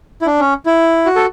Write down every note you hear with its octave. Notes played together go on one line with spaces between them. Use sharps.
E4
D4
C#4
E4
F#4
A4